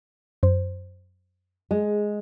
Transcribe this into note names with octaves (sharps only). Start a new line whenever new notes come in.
F#2 C5
G#3